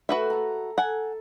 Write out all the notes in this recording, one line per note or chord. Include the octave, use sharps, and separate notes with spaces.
A3 F#4 B4 E5
A4 A#5
A4 F#5 G#5